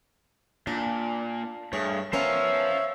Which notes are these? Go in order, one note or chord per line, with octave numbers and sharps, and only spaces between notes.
A#2 D4
G2 A3 G#4 C#5
B3 C#4 A#4 C5 C#5 E5 F5